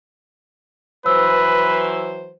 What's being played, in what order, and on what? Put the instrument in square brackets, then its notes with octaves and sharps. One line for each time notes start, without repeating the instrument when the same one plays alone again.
[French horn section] E3 F#3 C5 [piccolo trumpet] B4 [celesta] E6